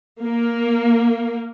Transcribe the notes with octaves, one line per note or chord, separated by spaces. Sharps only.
A#3